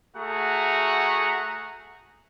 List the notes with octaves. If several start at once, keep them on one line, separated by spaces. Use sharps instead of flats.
A3 F#4 G#4 F#5 A#5